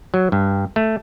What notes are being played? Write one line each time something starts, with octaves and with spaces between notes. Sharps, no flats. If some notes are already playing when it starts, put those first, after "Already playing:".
F#3
G2
A3